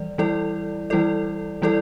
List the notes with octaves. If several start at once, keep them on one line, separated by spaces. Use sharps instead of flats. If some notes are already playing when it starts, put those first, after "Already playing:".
Already playing: E3 G3 D5
E3 G3 E4 A4 D5
E3 G3 E4 A4 D5
E3 G3 E4 A4 D5